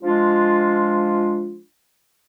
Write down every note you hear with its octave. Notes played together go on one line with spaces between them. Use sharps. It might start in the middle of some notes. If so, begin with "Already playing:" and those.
F3 G#3 D4 F4